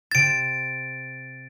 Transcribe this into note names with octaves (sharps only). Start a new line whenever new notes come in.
C3 A6 D7 E7